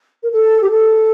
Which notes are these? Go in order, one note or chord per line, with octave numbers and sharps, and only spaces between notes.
A#4
A4
G4
A4